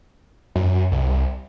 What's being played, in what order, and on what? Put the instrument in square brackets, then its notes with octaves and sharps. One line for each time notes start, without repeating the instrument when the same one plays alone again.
[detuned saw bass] F#2
C2